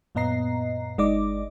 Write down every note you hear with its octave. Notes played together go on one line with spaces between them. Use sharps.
F#2 A#2 B3 D#5 A#5 C7
G1 G#3 D#4 D5 D#5 D6